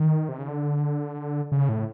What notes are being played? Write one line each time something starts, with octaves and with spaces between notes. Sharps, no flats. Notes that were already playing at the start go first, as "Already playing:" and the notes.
Already playing: D#3
C3
C#3
D3
C#3
A2